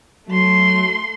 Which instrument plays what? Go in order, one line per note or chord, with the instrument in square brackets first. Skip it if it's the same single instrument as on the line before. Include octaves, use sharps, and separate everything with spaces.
[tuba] F#3 [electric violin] A3 C6